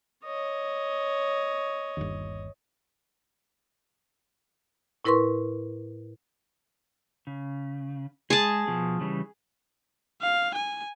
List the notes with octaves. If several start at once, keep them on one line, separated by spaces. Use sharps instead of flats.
C#5 D#5
G1 D#2
A2 E4 A#4 B4 C6 C#6
C#3
G#3 G#4 A5
B2 F3
C#3 E3 G3
F5
G#5